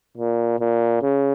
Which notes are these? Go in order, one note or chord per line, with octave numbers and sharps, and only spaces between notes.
A#2
A#2
C#3